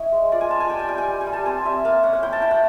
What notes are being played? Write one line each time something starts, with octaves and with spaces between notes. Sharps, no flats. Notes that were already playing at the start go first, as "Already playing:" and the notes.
Already playing: C#4 E4 D#5
G#3
F4 D5
G#5
F4 A5
G#5
G3 G5
G#5
G3 G5
G#5
G3
G#5
G3
A5
C4 G#5
C4 E5
A#3 F5
C#4 F#5
F#5
E4 G5
A5
E4 G5
F#5